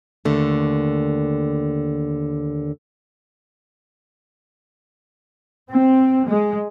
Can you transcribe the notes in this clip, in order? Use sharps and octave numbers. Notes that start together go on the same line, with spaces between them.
D#2 D3 A3
C4
G#3